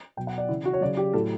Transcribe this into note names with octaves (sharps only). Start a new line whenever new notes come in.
B2 F#3 G5
F#5
D5
C#3 E3 E4
F#4
C#5
C#3 F#3 D5
G4
A2 F#3 A4